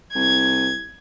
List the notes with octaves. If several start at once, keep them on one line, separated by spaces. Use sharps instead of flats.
C2 G#6